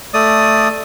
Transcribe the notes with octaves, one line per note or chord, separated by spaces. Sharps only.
A3 D5 D#6